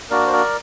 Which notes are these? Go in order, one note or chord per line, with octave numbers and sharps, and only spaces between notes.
A#3 D4 F#4 A#4 D5
C5
A#4 D5